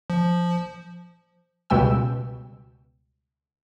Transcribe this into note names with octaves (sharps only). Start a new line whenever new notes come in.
F3
C#2 B2 G3 G5 E6